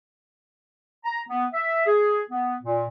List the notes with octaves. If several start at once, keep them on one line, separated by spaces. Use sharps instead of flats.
A#5
B3
E5
G#4
B3
A#2